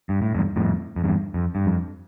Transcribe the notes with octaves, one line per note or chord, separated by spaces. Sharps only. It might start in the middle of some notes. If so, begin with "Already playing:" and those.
G2
A2
E2 G2
F2 A2
F2
E2 G2
F2
G2
F2